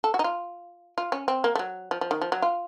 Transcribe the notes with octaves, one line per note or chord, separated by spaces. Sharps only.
A4
F#4
D#4
F4
F4
C#4
C4
A#3
A3
F#3
F3
F3
D#3
F3
F#3
F4